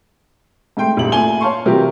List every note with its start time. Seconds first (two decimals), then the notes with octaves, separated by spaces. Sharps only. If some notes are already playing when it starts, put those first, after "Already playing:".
0.77 G#2 A3 G5 C6
0.97 D#1 A1 C#3 E4 F#7
1.12 A#2 A3 G#5 G7
1.41 C#5 F5 A5 C6 C#6
1.65 C3 E3 F#3 F4 G4 A#4